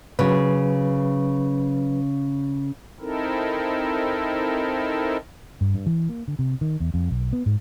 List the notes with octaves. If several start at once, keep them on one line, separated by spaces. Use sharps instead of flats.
C#3 F#3 B4
C4 D#4 E4 A4 A#4
G2
G2
E3
A#3
D3
C3
D#3
E2
F2
B1
B3
G#2